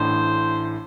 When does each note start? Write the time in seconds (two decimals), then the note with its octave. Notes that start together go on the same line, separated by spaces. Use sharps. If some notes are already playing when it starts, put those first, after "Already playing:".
Already playing: A1 A2 A3 D4 C5